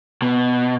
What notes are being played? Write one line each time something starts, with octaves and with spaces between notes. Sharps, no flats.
B2